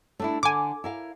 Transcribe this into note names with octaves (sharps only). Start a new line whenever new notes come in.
A3 D4 E4
D3 G#5 D6
E4 A#4 F5